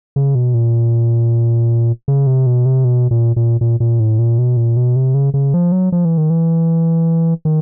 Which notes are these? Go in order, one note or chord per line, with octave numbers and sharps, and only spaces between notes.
C#3
B2
A#2
C#3
C3
B2
C3
B2
A#2
A#2
A#2
A#2
A2
A#2
B2
A#2
B2
C3
C#3
C#3
F3
F#3
F3
E3
D#3
E3
D#3